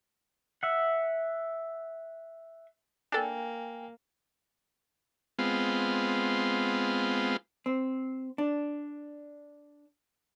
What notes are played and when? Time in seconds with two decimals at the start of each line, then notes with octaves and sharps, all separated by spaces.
0.63 E5 F#5
3.12 A#3 D4 A4 G5 G#5
5.39 G#3 B3 C4 F4
7.66 C4
8.38 D4